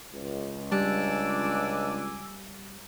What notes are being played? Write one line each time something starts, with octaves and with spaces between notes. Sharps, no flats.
C#2
G3 D4 G#5 D6 E6